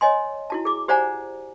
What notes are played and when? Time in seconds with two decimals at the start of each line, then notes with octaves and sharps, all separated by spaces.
0.01 C#5 D#5 G#5 C6
0.50 E4 F#4 A5
0.65 G#4 D6
0.88 G4 C5 D5 F#5 G#5 A#5